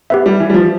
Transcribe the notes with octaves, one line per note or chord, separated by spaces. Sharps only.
B3 G4 B4 E5
G3
E3
G3
F3